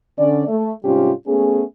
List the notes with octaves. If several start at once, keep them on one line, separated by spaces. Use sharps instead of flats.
D3 C#4 D5
A3
G#2 C3 G3 C#4 F4 G4
A3 B3 C#4 G#4